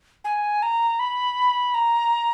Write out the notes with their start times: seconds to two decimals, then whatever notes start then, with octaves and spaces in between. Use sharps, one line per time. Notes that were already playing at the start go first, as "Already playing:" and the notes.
0.24 G#5
0.63 A#5
0.99 B5
1.74 A#5